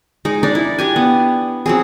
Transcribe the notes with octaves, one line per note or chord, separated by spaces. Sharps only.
G#3 D#4
D4 D#4 D5
E4
D4 G4 G#5
B3
F#3 C4 G#4